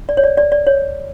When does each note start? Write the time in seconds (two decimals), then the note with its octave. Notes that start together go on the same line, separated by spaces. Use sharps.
0.09 D5
0.17 C#5
0.24 D5
0.37 D5
0.52 D5
0.67 C#5